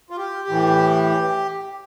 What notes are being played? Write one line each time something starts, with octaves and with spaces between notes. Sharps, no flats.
F4
G4
A2 E3